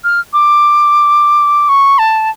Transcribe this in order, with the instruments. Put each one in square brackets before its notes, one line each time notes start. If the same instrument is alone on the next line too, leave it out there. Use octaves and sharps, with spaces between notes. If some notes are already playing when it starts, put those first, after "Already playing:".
[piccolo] F6
D6
C#6
A5